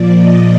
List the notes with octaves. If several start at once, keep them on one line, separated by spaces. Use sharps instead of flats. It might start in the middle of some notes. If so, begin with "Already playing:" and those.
Already playing: A#2 F3 D5
D#5